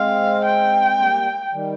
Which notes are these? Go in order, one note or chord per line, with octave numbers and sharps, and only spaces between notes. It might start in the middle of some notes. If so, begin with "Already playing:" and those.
Already playing: G#3 C4 F5
G5
G3 A#3
D#3 G3